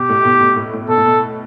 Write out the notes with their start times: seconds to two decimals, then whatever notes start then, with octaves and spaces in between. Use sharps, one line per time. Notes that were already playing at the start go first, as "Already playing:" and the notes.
Already playing: B2 G4
0.09 A2
0.25 B2
0.41 B2
0.56 A2
0.73 A2
0.88 B2 A4
0.97 A2
1.05 B2